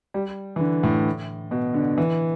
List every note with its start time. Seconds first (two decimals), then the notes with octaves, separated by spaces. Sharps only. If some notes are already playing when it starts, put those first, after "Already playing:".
0.14 G3
0.56 E3
0.60 D3
0.83 A2
1.51 B2
1.74 D3
1.98 E3